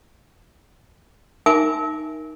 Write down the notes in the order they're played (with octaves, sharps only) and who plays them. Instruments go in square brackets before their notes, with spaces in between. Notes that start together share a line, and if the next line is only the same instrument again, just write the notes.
[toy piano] D#4 A#4 E5 G#5 D6